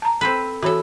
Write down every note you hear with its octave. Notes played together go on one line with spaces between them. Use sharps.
A5 A#5
C4 A4 B4
E3 F#4 A4 C#5